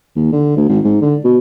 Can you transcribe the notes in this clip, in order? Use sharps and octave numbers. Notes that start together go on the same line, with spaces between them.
D#2
D3
D2
G#1
G#2
D3
B2